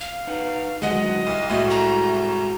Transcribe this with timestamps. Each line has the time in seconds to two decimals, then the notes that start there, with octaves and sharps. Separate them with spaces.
0.01 F5
0.27 D#4 B4 F#5
0.82 D2 D#3 F#3 G#3 D#5 F#5
1.27 C2
1.50 C2 A2 G#3 A3 F#4 D#5
1.70 A#5